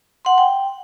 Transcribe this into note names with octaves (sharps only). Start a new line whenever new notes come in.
F#5 C6
G5